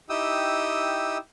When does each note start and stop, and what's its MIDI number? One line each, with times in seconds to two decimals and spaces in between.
0.09 1.18 63
0.09 1.18 64
0.09 1.18 67
0.09 1.18 79
0.09 1.18 87
0.09 1.18 88